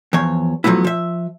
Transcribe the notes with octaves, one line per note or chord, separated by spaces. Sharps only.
E2 F3 C#5
F3 F#3 A3 B3 E4
F3 E5